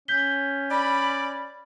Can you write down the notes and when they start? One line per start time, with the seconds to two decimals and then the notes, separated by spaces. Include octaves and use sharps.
0.08 C#4 G6 B6 G7
0.71 D5 B5